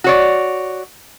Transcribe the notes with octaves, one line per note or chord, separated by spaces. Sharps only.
F#4 C#5 D5